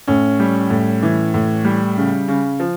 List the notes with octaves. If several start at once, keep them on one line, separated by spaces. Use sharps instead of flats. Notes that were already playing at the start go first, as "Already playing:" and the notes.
A2 C#4
G3
A2
E3
A2
G3
C#3
C#3
F3